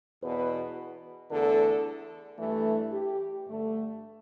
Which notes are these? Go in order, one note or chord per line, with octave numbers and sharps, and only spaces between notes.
E2 B2 B3 B4
E2 D3 A3 A4
G2 E3 A3
G4
G2 D3 A3